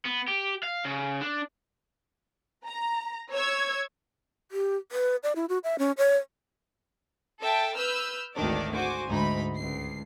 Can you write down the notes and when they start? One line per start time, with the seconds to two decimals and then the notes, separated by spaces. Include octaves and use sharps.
0.05 B3
0.28 G4
0.63 F5
0.85 C#3
1.21 D4
2.65 A#5
3.33 C#5 E6 G#6
4.52 G4
4.92 B4
5.23 D5
5.36 E4
5.49 F#4
5.64 E5
5.79 C#4
5.98 C#5
7.41 A4 E5 G5 A5
7.77 B4 E6 F6 G6
8.34 G#1 D2 A2 D#3 D4 D5
8.75 F#4 C5 G#5 D6
9.08 D2 G#2 D#4 B5
9.55 C#2 C7